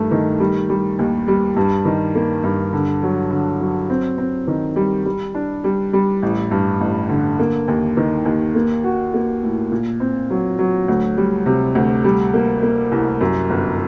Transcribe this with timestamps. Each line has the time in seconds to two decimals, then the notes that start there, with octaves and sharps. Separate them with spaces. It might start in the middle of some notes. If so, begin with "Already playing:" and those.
Already playing: G2 D#3 A3
0.11 D#3
0.40 G3
0.69 G3
0.99 D#2
1.28 G3
1.57 G2
1.85 D#3
2.15 A#3
2.44 G2
2.73 D3
3.03 F#3
3.31 D3
3.61 F#3
3.90 C4
4.18 C4
4.47 D#3
4.76 G3
5.05 G3
5.35 D4
5.64 G3
5.93 G3
6.22 A1
6.51 G2
6.81 A1
7.09 D3
7.39 A#3
7.68 D#2
7.97 D#3
8.25 D#2
8.55 A#3
8.84 F#4
9.14 A#3
9.43 A2
9.72 A#2
10.00 C4
10.30 F#3
10.59 F#3
10.88 D2
11.18 G3
11.46 C3
11.75 D2
12.04 G3
12.34 A#3
12.63 A#3
12.92 C2
13.21 F#2
13.50 G1